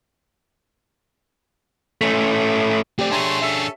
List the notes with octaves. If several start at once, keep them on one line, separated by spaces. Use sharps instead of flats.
A3 C#4
A3 C4 G4 D5
A3 D4 G#4 C#5 G#5 A#5 C6
C#4 A4 E5